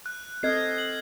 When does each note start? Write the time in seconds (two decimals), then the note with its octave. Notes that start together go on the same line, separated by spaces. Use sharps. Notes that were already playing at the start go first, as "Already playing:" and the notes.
0.06 F#6
0.43 C4 A4 D#5 F6 G#6 C7
0.78 F#7